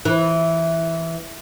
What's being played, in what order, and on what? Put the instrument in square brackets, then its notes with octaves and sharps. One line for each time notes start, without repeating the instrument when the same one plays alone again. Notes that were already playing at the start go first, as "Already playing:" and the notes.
[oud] E3